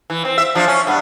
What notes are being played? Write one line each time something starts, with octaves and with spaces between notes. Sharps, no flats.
E3
C4
E5
F3 D4
C#4
G2 B3